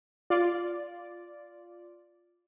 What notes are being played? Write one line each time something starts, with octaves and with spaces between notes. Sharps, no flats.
F4 D5